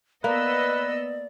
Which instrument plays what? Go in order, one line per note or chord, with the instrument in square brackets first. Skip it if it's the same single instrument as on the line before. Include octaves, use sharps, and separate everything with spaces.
[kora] A#3 [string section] B3 D#5 E6 [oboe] B4 [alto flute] D5